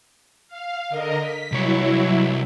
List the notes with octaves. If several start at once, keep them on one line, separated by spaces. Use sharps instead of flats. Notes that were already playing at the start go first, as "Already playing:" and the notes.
F5
D3 A#4 D#5
B6
C2 F#3 E4 C#5